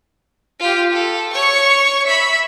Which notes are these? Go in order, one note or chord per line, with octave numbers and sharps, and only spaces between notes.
F4 G4
A4
C#5 C#6
E5 B5